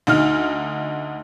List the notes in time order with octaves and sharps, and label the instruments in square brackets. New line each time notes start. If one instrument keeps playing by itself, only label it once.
[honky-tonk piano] D2 D#4 F6